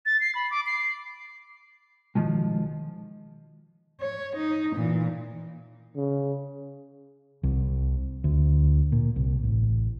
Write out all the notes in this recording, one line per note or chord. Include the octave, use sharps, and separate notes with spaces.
A6
C7
B5
D6
C7
B1 G#2 D#3 F3 G#3
C#5
D#4
A#2 E3
C#3
C2
D2
A#2
C2
A1